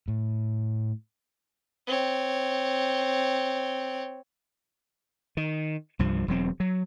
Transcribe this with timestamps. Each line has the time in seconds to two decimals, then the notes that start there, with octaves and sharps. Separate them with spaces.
0.08 A2
1.87 C4 C#5
5.37 D#3
5.99 C2 G2 F3
6.28 E1 F#3 C4
6.60 F#3